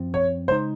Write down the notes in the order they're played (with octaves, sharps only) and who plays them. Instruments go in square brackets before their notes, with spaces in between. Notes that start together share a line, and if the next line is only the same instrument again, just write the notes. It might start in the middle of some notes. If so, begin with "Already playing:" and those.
Already playing: [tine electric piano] F#2 F3 C4
[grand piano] C#5
[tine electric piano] C#3 G#3 D#4 [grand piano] C5